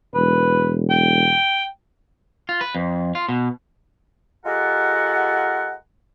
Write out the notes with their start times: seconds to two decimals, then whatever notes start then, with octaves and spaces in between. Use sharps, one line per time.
0.15 E1 B4
0.90 G5
2.49 F4
2.61 B4
2.75 F2
3.15 F4
3.29 B2
4.45 G#3 F4 G4 A4 A#4 F#5